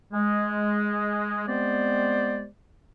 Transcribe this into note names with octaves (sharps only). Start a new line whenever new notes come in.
G#3
G3 G#3 B3 C4 C5 D5